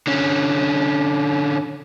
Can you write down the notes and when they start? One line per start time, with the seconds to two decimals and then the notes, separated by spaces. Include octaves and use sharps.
0.07 D3 C#4